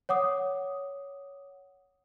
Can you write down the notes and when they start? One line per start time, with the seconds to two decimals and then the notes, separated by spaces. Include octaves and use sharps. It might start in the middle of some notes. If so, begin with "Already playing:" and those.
0.09 C#5 F#5 D6 D#6